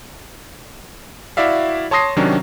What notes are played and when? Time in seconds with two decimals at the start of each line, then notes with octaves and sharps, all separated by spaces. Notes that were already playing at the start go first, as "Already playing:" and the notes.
1.37 E4 F#4 D5 E5 F5
1.91 C#5 A5 C6 D#6 A#6 C7
2.16 C3 D#3 F#3 C#4 D4